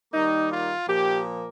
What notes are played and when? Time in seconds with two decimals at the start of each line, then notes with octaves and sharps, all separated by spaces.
0.13 D#3 G3 A#3 D#4
0.51 F4
0.88 A#2 F3 A#3 G4